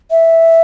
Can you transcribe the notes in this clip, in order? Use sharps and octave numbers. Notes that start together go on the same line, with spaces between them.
E5